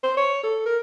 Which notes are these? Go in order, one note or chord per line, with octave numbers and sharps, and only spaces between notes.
C5
C#5
A4
A#4